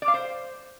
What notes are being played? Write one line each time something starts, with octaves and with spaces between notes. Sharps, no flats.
D5
F5
C5